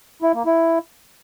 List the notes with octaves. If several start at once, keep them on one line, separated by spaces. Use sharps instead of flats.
E4
A#3
E4